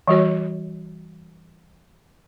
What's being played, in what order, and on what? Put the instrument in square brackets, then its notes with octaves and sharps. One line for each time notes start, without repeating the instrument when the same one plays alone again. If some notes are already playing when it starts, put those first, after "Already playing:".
[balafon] E3 G3 F#4 C#5